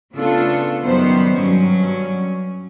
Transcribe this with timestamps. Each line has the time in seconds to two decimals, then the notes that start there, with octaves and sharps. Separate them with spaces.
0.13 C#3 A3 B3 D4 F4 A4
0.83 F#2 D#3 G3 B3 C5
1.37 G2 F#3 C#4